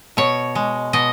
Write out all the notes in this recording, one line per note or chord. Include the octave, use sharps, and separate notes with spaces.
B2 C#5
G#3
B2 D#5